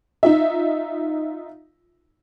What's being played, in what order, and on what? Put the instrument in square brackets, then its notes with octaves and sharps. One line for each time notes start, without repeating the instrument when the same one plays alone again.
[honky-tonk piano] D#4 F4 E5